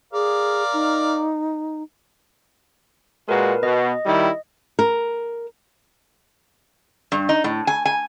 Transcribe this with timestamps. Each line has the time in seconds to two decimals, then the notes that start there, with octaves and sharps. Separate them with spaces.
0.13 G#4 A#4 D5 F5
0.73 D#4
3.29 A#2 G#3 F#4 A#4 B4
3.63 B2 D#5
4.06 D#3 G3 E4
4.79 A#4
7.12 G2
7.29 D#4
7.44 A2
7.67 G#5
7.85 G#5